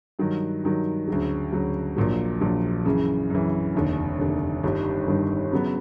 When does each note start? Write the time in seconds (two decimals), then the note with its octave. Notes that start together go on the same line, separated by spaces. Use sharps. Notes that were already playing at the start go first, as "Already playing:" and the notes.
0.19 G2 D#3 F#3
0.63 G2 D#3 F#3
1.08 D2 C#3 F#3
1.52 D2 C#3 F#3
1.97 A#1 A#2 F#3
2.41 A#1 A#2 F#3
2.85 F#2 C#3 E3
3.30 F#2 C#3 E3
3.74 F1 D#2 D3
4.19 F1 D#2 D3
4.63 G1 G2 D#3 G3
5.07 G1 G2 D#3 G3
5.51 C#3 F#3 B3